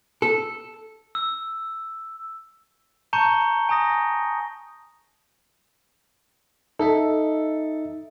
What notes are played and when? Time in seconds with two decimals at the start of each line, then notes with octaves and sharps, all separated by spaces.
0.22 A4
1.15 E6
3.13 A5 A#5 C#6 G6 C#7 G7
3.69 G#5 A#5 D#6 A#6
6.79 D#4 A4 D#5 E5